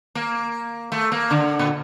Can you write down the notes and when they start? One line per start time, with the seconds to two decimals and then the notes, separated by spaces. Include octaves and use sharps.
0.15 A#3
0.92 A3
1.12 A#3
1.31 D3
1.59 A#2